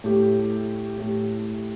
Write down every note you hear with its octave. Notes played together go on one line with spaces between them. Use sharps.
A2 A3 G4
A2 A3 G4